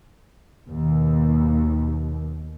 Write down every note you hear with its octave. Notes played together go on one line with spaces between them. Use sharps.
D#2 B2